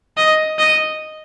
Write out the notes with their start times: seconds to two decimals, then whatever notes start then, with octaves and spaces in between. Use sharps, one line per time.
0.17 D#5
0.59 D#5